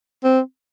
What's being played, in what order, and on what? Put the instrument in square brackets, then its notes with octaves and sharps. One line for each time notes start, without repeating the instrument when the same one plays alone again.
[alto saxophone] C4